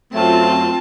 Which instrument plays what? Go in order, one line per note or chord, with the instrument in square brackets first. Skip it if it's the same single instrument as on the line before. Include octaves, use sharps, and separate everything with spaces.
[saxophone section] F#2 F#3 A3 [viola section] C4 F4 [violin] A5